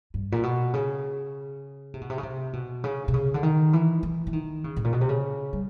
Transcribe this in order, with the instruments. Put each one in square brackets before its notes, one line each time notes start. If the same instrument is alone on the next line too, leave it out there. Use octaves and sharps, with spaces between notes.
[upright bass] G2
A#2
B2
C#3
C3
B2
C3
C#3
C3
B2
C#3
C3
C#3
D3
D#3
E3
E3
E3
D#3
C#3
A2
A#2
B2
C3
C#3
G3